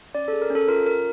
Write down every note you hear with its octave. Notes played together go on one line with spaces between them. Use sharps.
C#4 D5
A4
G#4
A#4
C#4
A4
F4 A#4
C#4 A#4